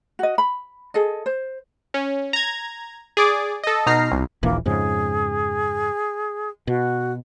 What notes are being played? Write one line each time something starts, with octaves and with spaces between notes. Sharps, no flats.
F#4 D#5
B5
G#4 A4 D#5
C5
C#4
A#5 G#6
G#4 D5 D6
A4 D#5
B2 D#4 A#5 F6 C7
C2
D#1 A#1 E3 A#3
F2 G#2 C#3 G#4
B2 F#4